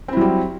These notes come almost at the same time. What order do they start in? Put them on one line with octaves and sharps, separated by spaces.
C4 E4 F#3 G3